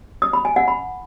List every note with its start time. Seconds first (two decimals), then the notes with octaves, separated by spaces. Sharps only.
0.22 D#6
0.33 B5
0.45 G#5
0.56 F#5
0.68 B5